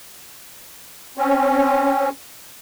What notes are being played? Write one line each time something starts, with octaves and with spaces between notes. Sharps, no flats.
C4 C#4